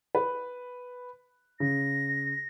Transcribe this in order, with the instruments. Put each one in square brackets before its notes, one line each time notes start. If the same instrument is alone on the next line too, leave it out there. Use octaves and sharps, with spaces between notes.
[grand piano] B4
[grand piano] C#3 [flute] A#6